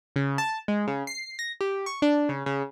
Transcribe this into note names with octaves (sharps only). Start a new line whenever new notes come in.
C#3
A5
G#3
C#3
C7
A#6
G4
C#6
D4
C#3
C#3